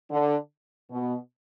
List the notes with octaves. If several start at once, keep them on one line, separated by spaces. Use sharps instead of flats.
D3
B2